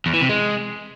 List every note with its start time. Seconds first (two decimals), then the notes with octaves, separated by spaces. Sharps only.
0.06 E2
0.14 E3
0.21 C3
0.29 G#3